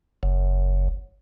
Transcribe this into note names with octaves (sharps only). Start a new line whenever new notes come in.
F#1